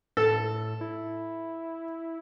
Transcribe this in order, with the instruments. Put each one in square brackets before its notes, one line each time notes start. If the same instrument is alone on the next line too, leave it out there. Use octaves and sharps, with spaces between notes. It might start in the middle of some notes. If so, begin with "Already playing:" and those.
[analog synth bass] A2 [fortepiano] A4
[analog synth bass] E4